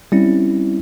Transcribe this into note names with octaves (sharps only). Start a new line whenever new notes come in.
G3 C4 C#4 E4